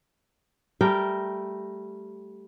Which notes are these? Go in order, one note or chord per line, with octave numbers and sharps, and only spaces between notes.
G3 A3 A#4 G5